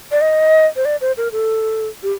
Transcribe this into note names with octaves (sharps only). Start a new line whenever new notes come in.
D5
D#5
C5
D5
C5
A#4
A4
G4